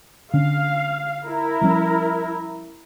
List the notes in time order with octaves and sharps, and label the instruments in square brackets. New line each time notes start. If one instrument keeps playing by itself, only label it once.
[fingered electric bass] D3 C#4 [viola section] F5
[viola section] E4 A#4
[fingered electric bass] F3 G3 C#4